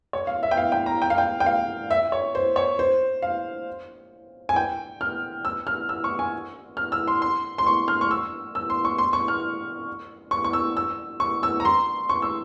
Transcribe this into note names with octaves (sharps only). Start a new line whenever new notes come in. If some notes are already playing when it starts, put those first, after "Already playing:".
C#5
F5
E5
G5
F5
G5
A#5
G5
F5
G5
G5
F5
E5
C#5
C5
C#5
C5
F5
G#5
G5
F6
E6
F6
E6
C#6
G#5
F6
E6
C6
C6
C6
C#6
F6
C#6
E6
E6
C6
C#6
C6
C#6
F6
C#6
C#6
E6
E6
C#6
E6
A#5
C6
C#6
E6